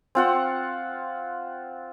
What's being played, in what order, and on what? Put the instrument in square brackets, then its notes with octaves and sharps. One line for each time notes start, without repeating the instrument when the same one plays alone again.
[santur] C4 F4 F#5